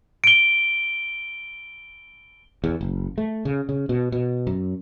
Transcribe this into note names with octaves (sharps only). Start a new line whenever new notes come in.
D7 G7
E2
F#1
A3
C#3
C#3
B2
B2
F#2